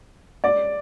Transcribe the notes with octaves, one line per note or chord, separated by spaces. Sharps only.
D5